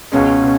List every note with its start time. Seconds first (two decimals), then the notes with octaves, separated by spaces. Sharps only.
0.12 C#2 B2 G#3 C#4
0.42 B2